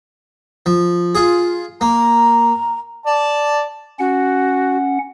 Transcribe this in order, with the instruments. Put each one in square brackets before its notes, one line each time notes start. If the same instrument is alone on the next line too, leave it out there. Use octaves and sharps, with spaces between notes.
[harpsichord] F3
F4 G#4
[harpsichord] A#3 [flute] A#5
[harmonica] D5 A5
[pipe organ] C#4 F#5 [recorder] F#4